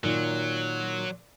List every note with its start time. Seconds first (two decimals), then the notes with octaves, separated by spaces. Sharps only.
0.04 A#2 D#3 F#3